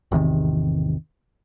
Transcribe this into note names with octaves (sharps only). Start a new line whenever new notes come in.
G#1 E2 C3 D#3